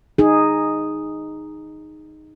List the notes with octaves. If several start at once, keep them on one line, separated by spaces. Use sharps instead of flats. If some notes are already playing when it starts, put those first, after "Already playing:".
D#4 G#4